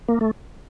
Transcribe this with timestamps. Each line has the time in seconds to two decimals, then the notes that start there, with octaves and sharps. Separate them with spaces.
0.08 A#3
0.21 A3